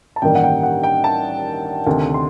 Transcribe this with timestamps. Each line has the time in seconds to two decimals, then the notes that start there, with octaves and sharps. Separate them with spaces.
0.16 A5
0.22 A1 G2 D#3 G3 A#3 G5
0.35 F#5
0.44 G5
0.63 F#5
0.83 G5
1.04 A5
1.87 D2 C3 D#3
2.14 C6